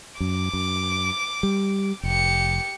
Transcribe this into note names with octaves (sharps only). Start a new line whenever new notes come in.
F#2 D6
F#2
G3
F1 G4 C#7